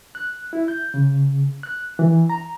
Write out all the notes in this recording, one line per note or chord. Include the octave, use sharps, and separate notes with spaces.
F#6
E4
G6
C#3
F#6
E3
A#5